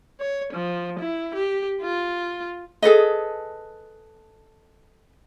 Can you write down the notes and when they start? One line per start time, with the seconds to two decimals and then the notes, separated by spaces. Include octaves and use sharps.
0.20 C#5
0.53 F3
1.00 E4
1.35 G4
1.82 F4
2.82 G#4 A4 B4 D#5